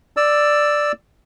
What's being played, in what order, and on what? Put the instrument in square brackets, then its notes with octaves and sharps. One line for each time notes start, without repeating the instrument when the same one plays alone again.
[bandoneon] D5 E6